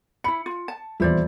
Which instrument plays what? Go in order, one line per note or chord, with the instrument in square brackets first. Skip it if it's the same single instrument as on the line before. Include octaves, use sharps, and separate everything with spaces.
[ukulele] E4 B5 [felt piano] C#7
[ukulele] F4
A5
[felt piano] D#1 E2 E3 [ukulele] E4 C5 D5